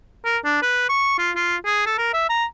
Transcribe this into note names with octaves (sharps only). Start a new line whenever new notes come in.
A#4
D4
B4
C#6
F4
F4
G#4
A4
A#4
E5
A#5